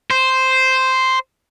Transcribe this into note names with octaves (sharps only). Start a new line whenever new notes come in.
C5